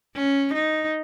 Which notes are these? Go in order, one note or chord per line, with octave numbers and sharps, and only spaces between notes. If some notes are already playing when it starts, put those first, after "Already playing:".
C#4
D#4